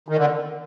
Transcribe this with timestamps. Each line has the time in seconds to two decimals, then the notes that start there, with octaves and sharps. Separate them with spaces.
0.08 D#3
0.17 D3